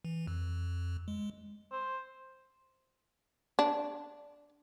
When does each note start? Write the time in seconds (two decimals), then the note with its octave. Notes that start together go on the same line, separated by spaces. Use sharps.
0.05 E3
0.27 F2
1.08 G#3
1.72 C5
3.59 D4